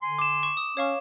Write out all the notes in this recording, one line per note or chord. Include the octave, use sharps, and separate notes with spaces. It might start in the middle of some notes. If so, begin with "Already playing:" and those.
D3 G#5 C6
D6 E7
C#6 E7
D#6
C#4 C#5 F5 C#6